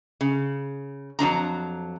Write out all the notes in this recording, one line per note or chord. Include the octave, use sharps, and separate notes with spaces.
C#3
F2 F#3 D4 A#5